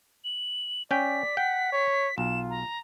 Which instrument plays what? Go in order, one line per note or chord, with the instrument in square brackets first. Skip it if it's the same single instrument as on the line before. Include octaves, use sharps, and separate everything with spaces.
[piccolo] F#7
[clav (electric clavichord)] C#4 G5 [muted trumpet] D5 [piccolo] B6
[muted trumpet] F#5 [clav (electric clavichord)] G5
[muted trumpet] C#5
[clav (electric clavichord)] B1 [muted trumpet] F4 [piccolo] E7
[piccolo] A#5